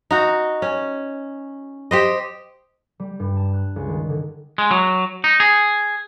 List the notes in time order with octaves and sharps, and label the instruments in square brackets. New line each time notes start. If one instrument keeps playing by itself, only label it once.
[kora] D#4 F#4
C#4
G4 C5 D#5
[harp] G3
G2
A5
F#6
C#2
D#3
D3
[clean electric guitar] G#3
F#3
D#4
G#4